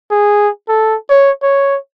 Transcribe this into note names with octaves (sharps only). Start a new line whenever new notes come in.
G#4
A4
C#5
C#5